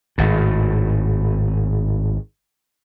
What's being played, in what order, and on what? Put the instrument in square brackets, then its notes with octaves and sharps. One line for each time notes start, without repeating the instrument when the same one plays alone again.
[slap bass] G#1 A2